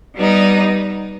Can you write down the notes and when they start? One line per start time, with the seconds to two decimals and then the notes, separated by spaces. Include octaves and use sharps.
0.16 G3 B3 D#4